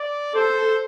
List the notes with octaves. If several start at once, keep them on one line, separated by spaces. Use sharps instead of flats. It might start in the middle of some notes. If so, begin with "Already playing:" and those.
Already playing: D5
A4 C5